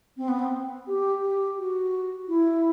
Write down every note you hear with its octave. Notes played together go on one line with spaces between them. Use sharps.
C4
B3
C4
G4
G4
F#4
E4